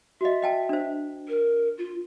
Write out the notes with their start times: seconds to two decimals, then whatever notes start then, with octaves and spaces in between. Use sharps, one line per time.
0.21 F#4 D#5 E5
0.42 D#5 G5 A5
0.69 D4 C5
1.28 A#4
1.77 F4